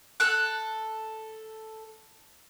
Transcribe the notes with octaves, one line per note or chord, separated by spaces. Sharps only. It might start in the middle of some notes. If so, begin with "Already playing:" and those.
A4 F#6